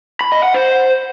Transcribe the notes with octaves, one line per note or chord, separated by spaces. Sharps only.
B5
D#5
F#5
C5